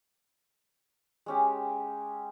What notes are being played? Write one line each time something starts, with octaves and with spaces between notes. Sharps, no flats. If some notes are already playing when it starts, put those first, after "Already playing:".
G#3 C#4 G4